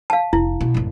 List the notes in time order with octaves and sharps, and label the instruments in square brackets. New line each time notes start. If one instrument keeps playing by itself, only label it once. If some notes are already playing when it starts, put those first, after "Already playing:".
[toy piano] F5 A5
[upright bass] F1 [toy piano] E4
[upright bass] B2
G#1 F2